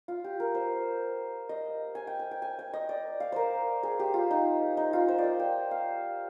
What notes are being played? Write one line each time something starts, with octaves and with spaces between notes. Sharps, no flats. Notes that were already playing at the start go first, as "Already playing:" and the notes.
F4
G4
A#4
C5
D#5
G#5
G5
G#5
G5
G#5
G5
D#5
D5
F5
A#4 C5
G#4
G4
F4
D#4
D#4
F4
C5
D5
D#5
G5
F5